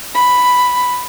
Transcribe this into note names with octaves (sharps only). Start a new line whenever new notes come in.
B5